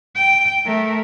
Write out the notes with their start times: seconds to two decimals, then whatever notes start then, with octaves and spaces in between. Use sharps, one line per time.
0.15 G5
0.65 A3 A#4